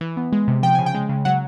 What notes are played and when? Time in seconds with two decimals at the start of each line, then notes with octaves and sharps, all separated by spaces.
0.01 E3
0.17 B3
0.32 G#3
0.48 C3
0.63 F3 G5
0.75 C#3 G#5
0.86 G5
0.94 G#3
1.09 C#3
1.25 F#3 F#5